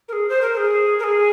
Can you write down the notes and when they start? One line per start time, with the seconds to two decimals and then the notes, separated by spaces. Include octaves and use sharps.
0.08 A#4
0.12 G#4
0.29 C5
0.41 A#4
0.53 A#4
0.57 G#4
0.98 A#4
1.03 G#4